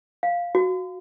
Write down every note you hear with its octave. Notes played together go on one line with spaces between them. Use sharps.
F5
F#4